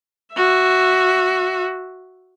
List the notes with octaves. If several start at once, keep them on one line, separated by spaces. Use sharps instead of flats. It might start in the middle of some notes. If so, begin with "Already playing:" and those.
F#4 E5